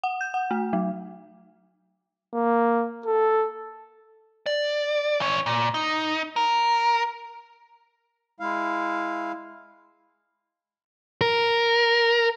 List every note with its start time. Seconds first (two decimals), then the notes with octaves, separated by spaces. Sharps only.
0.03 F#5
0.21 G6
0.34 F#5
0.51 A3
0.73 F#3
2.34 A#3
3.06 A4
4.46 D5
5.20 E3 C#5
5.46 A#2
5.74 D#4
6.36 A#4
8.40 G#3 E4 F5
11.21 A#4